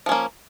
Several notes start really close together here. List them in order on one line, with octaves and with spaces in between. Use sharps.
F3 C#4 A#3